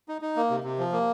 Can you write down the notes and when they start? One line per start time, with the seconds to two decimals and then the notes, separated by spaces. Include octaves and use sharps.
0.08 D#4
0.22 D#4
0.36 A#3
0.50 C3
0.64 C3
0.78 F3
0.92 A#3